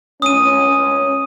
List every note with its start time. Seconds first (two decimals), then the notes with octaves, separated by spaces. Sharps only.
0.22 C#4 D#6 D#7